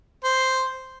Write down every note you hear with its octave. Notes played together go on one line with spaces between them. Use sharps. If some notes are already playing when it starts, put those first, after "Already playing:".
C5